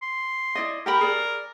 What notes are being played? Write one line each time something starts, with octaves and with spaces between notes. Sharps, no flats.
C6
E4 D5 D#5
G4 A#4 G5 B5
G#4 D5